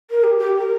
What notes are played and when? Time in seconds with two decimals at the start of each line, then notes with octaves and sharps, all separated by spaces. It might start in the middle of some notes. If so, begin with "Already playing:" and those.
0.11 A#4
0.24 G4
0.39 G4
0.58 A#4